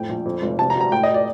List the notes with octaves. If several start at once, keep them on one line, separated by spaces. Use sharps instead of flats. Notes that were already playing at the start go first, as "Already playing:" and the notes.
Already playing: F2 A2 G5
A#1
F2
F1
C3 A5
A#5
D2
A#5
A2 G5
D#5
D5